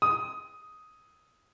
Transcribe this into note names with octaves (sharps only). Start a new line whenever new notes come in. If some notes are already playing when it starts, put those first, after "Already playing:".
D#6